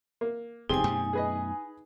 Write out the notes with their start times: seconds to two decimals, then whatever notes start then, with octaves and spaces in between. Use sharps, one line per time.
0.21 A#3
0.69 F1 E2 G2 C4 D#4 G4 G#4 G#5
0.86 F#2 B2 A3
1.13 G#4 B4 D#5